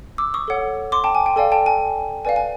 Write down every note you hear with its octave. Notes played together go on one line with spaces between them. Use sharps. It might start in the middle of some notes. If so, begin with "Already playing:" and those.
D6 E6
C#6 D#6
A4 C#5 F#5
C6 D6
G5 A5
G#5
G5
A4 D5 F5 G#5
G5 A5
G#5
B4 D5 F5 G#5
G#5